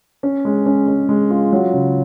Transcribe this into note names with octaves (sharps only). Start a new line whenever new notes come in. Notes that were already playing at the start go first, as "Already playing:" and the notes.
C#4
G#3
C#4
G#3
G#3
F4
F#3
C#3